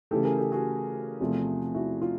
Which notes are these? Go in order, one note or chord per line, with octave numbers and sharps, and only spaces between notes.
C#3 E3 A3 G4 A4
G#4 A#4
G4 A4
F#4 G#4
E2 C3 F3 A3
E4 F#4
F4